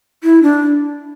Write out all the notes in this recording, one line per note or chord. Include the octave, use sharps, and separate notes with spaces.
E4
D4